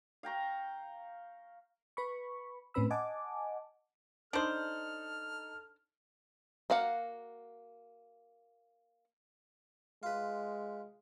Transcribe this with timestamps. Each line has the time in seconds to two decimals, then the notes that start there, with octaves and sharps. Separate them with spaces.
0.23 F5 G5 A#5 C#6
1.97 B4 B5 C#6
2.74 A2 C4 C#4 B4 B5 E6
2.90 D#5 F#5 G#5 A5 D6
4.33 D4 D#4 A4 C5 D#6 F6 F#7
6.70 A#3 F#4 F5 F#5
10.03 G#3 F4 B4